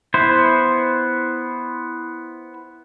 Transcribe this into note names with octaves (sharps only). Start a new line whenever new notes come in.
B3 E4 C5